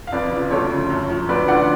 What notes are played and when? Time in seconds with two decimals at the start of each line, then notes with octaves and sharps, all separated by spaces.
0.07 F5
0.12 F2 B4 D5
0.32 C#3 F3
0.51 D2 A4 C#5
0.70 C#3 F3
0.90 F#2
1.09 F3
1.29 D2 B4 D5
1.48 D3 F3 D5 F#5